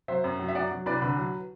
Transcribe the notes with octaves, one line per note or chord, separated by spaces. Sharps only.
F#3 C5 E5
F#2
F#3
E5
F#3 D5 F#5
F#3
C2 B4 D5
D3 B4
F#3